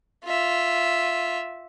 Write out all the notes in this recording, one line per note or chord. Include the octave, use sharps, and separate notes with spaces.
F4 E5